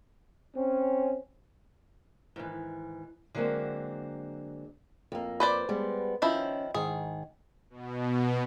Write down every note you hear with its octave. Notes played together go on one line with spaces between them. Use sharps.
C4 C#4
G#2 D#3 E3
D3 F#3 G#3 A#3 C4
F2 A#3
B4 C5 D5
G3 G#3 B3
D#3 F3 C#4 E4
G#2 D#3 G#4
B2